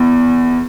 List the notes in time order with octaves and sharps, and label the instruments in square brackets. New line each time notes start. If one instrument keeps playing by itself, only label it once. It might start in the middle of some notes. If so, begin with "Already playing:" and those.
Already playing: [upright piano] E2